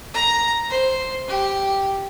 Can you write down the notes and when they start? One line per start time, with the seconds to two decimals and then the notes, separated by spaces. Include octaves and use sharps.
0.14 A#5
0.70 C5
1.27 G4